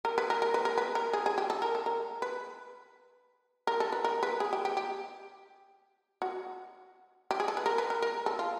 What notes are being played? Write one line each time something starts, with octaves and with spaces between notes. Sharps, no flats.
A#4
B4
A#4
A#4
B4
A#4
B4
A#4
G#4
G#4
G4
A4
A#4
A4
A#4
B4
A#4
A4
B4
A#4
B4
G#4
G4
G4
G4
F#4
G4
G#4
A4
B4
A#4
B4
A#4
A#4
A4
F4